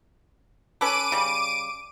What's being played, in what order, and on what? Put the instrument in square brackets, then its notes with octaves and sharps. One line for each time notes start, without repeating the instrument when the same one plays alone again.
[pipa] C#4 A4 B4 [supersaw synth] D6 D7 D#7
[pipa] C#3 G3